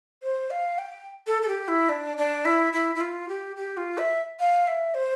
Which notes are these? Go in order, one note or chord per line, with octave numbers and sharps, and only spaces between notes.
C5
F5
G5
A4
A4
G4
E4
D4
D4
E4
E4
E4
F4
G4
G4
F4
E5
F5
E5
C5